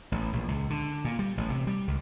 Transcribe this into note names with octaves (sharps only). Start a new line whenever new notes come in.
A1
A#1
C#2
D3
A#2
G3
A1
C3
G3
C#2